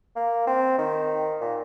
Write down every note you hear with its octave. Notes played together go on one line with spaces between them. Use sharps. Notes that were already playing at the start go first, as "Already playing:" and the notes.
A#3
C4
D#3
A#2